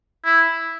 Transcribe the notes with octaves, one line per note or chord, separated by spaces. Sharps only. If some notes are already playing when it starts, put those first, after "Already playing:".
E4